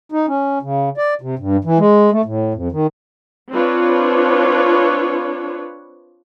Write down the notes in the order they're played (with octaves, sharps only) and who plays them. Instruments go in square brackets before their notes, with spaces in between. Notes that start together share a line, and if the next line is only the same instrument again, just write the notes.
[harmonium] D#4
C#4
C#3
D5
C3
G2
E3
G#3
A3
A2
F2
D#3
[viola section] C4 D4 F4 B4 C#5